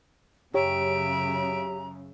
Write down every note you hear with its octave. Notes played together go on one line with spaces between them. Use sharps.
F#2 C#3 G4 C#5 E5 A#5 D7